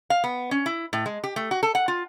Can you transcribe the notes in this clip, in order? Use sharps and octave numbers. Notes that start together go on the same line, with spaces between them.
F5
B3
C#4
E4
A2
G#3
G4
A3
F#4
A4
F#5
F4